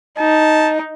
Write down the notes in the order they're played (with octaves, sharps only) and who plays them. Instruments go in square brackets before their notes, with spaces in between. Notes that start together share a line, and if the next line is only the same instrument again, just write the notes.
[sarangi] D#4 [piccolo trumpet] A5